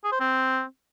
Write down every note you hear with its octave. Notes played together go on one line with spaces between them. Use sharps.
G#4
C5
C4